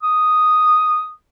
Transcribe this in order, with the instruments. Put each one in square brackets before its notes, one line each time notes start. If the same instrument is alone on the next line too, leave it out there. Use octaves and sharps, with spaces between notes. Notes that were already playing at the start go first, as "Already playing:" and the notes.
[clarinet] D#6